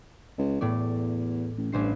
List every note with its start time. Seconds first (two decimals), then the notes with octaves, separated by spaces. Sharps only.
0.38 C#2
0.61 E2 A2 A3 D5
1.58 A1
1.72 A1 G2 C5 C7